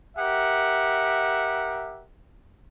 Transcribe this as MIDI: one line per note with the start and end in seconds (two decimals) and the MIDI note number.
0.17 2.04 67
0.17 2.04 70
0.17 2.04 76
0.17 2.04 78